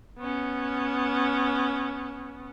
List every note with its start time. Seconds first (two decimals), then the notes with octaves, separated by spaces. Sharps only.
0.19 B3 C#4